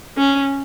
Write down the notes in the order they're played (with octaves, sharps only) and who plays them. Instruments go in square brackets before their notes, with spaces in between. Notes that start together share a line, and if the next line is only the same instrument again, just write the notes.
[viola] C#4